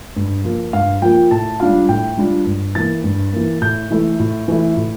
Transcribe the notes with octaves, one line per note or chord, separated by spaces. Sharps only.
G2
F3 A#3 F4
G2 F5
F3 A#3 F4 G5
A2 A5
G3 D4 F4 F5
A2 G5
G3 D4 F4
G2
E3 A#3 A6
G2
E3 A#3
A2 G6
E3 A3 E4
A2
E3 A3 E4
A2